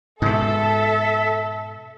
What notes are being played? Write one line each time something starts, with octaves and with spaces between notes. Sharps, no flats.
G#2 B2 A4 E5